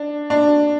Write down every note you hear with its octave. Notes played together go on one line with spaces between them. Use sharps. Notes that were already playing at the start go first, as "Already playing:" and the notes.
Already playing: D4
D4